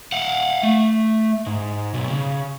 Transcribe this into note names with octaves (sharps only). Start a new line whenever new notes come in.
F5 F#5
A3
G#2
B1
C#3